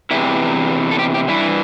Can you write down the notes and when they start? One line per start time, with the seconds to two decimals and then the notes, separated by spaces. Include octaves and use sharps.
0.11 E2 C3 E3 E4
0.91 A4
0.99 G4
1.14 G4
1.28 G2 E3 E4